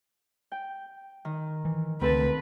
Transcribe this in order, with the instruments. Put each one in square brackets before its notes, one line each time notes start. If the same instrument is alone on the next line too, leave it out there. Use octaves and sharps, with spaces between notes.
[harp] G5
D#3
[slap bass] E3
[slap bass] C#2 D3 A3 [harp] C4 A4 A5 [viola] B4